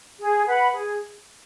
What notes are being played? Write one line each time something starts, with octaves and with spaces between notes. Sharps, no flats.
G#4
B4 F#5 B5
G#4